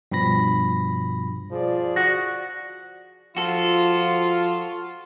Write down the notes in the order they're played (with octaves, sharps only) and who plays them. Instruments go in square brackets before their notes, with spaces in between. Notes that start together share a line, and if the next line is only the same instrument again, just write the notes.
[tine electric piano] G2 B2 F3 B5 A#6
[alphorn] F3 [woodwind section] G#4 D5
[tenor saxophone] F#4 [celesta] A#6
[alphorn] F3 [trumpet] F4 [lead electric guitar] F#4 A4